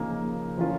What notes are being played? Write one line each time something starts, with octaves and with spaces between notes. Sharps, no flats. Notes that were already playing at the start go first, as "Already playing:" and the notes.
Already playing: C#3 F3 A#3 D#4
F3 C#4 F4